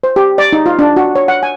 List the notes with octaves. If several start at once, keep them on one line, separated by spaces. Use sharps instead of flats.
C5
G4
D5
D#4
F4
D4
F#4
C#5
F#5
G#5